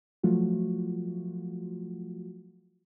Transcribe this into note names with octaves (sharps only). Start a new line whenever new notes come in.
F3 F#3 A3 F4 F#4